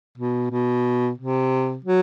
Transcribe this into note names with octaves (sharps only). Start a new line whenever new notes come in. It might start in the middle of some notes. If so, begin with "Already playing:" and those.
B2
B2
C3
F#3